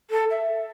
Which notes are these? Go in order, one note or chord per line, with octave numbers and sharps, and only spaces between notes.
A4
E5